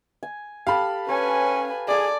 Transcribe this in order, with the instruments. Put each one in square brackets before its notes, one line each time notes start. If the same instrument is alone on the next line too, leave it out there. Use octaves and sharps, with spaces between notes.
[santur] G#5
[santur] G4 A4 [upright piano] F5 B5
[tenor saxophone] C#4 [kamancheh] B4 G#5 [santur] C#5
[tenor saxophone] G#4 [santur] A4 G#5 [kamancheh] D5